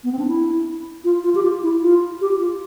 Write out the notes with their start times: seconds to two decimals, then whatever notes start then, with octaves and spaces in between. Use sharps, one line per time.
0.04 B3
0.12 C4
0.19 D4
0.28 E4
1.04 F4
1.24 F4
1.35 G4
1.43 F4
1.63 E4
1.82 F4
2.21 G4
2.39 F4